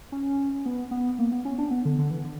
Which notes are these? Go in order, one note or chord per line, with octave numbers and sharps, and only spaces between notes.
C#4
B3
B3
A#3
B3
C#4
D4
B3
D3
D3
E3
D3